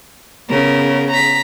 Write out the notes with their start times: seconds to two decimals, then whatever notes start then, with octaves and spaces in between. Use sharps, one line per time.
0.50 C#3 B3 A#4
1.10 A#5 B6